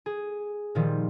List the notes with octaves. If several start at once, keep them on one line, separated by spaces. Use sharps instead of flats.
G#4
A#2 D#3 F3 G3